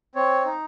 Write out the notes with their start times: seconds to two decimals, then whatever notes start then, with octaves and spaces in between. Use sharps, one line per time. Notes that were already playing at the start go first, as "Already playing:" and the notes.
0.15 C4 C#5
0.45 D#4